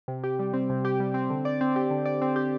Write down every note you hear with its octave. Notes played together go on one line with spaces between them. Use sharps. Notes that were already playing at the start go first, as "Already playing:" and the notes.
C3
G4
G3
C4
C3
G4
G3
C4
D3
D5
C4
G4
D3
D5
C4
G4